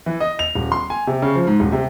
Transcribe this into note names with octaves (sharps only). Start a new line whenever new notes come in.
E3
D#5
F7
D#1
C6
G#5
C3
C#3
F3
G#2
D#1
C3